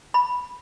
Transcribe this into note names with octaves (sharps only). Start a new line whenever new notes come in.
B5